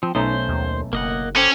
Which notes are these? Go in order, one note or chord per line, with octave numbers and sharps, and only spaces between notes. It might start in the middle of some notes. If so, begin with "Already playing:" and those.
F3 C4
B1 A3 C#4 D#4 C5
D#2
F#1 A#3 D#5 F#5
C#4 A4 C5 G5 D6